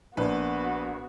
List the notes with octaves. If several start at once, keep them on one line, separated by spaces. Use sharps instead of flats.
A#1 B3 F#4 B4